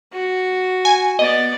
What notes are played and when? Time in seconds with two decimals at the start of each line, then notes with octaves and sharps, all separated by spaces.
0.12 F#4
0.85 G#5
1.19 B3 D5 D#5